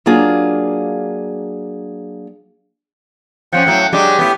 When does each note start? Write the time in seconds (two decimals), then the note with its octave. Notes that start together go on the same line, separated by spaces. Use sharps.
0.06 F#3 A#3 D4 F4 G#4
3.53 F3 C4 C#4 F#5 G5
3.67 A2 F#3
3.93 F#3 G#3 D4 G4
4.19 A2 B3